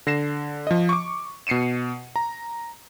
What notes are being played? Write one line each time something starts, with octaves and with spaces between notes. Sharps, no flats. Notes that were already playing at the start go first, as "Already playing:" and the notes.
D3 A#6 C7 E7
F3 D#5
C#6 D6
B2 C7 C#7 D#7 E7
A#5